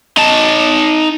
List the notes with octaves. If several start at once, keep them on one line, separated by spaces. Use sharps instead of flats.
D#4 A5